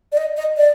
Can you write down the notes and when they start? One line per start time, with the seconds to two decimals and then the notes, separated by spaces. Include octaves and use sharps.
0.12 D5
0.17 D#5
0.37 D#5
0.57 D5